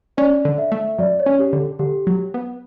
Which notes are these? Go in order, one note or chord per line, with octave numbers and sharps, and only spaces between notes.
C#4 D5
D3
E5
A3
F#2 D5
C#5
C#4
G4
D3
A4
D3 G4
F#3
B3